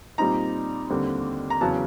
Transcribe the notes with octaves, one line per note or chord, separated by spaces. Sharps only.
A#2 G3 C4 D#4 A#5
D#2 D3 G3 C4
A#5
E2 C#3 F#3 A5